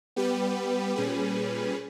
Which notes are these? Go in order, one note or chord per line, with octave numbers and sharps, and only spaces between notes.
G3 B3 G4 B4
A#2 G3 C#4 G#4 B4